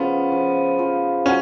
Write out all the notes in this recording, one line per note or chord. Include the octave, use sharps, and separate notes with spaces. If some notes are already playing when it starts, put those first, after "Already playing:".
Already playing: C#3 F3 B3
F3
F3
F#3 C#4